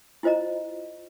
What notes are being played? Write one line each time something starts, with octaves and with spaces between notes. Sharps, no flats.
E4 F4 C5 D#5 A#5